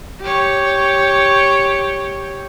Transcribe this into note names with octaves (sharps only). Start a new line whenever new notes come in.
G4 C#5